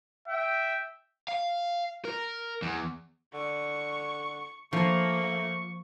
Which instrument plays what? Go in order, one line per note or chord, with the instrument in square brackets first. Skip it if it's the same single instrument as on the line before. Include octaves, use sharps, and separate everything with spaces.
[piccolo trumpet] E5 [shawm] G5
[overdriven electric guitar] F5
A#4
E2
[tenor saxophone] D3 [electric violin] C#6
[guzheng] F3 [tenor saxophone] A3 [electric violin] A#3 [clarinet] C#6